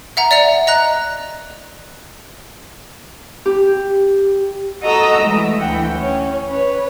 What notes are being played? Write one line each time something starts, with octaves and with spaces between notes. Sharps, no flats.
E5 F#5 A#5
D5 E5 F#5 F7
D#5 A#5 F#6
G4
F#4 A4 D#5 A#5 D#6 E6
E3 G#3 A3
D2 E3 F#5 G5
C#4
B4 C#5